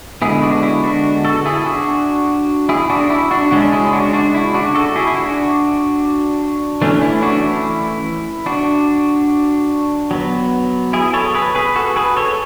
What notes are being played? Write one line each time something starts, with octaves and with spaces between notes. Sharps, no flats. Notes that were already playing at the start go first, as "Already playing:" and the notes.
D3 G#3 B3 E4 G#4
D4 F#4
E4
D4 F#4
F#4 A4
E4 G#4
D4 F#4
E4 G#4
D4 F#4
E4
D4 F#4
C#3 G#3 C#4 D4 F#4
E4 G#4
D4 F#4
D4 F#4
E4
D4 F#4
F#4 A4
E4 G#4
E4
D4 F#4
E3 A3 C#4 D4
E4
D4 F#4
E4
D4 F#4
F#3 B3
E4 G#4
A4 C#5
G#4 B4
G#4 B4
F#4 A4
G#4 B4
A4 C#5